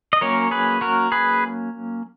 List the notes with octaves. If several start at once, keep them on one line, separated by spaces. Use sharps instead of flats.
D#5
F#3 A#3 C#4 A#4 C#5
G#4 B4
F#4 A#4
G#4 B4